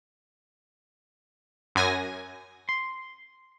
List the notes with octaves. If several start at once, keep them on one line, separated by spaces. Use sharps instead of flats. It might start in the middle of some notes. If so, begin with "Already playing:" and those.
F#2 G#5 A#6
C6